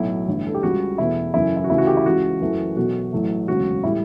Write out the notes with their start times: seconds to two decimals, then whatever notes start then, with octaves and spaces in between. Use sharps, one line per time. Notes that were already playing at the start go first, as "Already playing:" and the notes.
Already playing: B1 A2 F#3 A3 E4
0.28 A1 G2 D3
0.47 A4
0.54 G4
0.63 C#2 C#3 G3 F#4
0.98 E2 B2 A3 E4
1.34 F#2 C#3 E3 A3 E4
1.57 E4
1.64 F#4
1.70 D2 C#3 E3 A3 E4
1.78 F#4
1.87 G4
1.97 E4
2.05 C#2 C#3 E3 F#4
2.41 F#2 E3 A3
2.77 B1 B2 A3 F#4
3.12 A1 A2 F#3 A3
3.48 E1 D2 C#3 F#3 F#4
3.84 A2 G3 E4